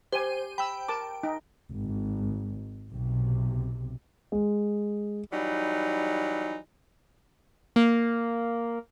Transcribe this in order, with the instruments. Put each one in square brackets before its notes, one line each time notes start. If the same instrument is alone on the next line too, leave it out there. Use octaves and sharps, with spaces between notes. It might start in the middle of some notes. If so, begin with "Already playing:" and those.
[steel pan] G4 G#5 [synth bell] C5 D#7
[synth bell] G5 [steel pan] B5 E6
[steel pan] A#4 A5 D6
D#4
[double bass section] G#1
B1 C3
[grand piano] G#3
[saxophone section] E3 F#3 G3 D#4
[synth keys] A#3